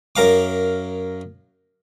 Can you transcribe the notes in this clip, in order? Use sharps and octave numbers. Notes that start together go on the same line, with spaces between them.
F#2 A#4 F5 D6